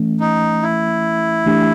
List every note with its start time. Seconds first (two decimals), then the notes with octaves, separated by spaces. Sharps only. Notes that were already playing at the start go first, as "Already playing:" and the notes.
Already playing: E3 A3 C#4
0.20 D#4
0.63 E4
1.46 E3 A3 D4 G4